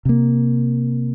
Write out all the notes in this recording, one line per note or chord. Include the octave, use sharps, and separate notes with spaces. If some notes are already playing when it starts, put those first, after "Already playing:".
C3 A#3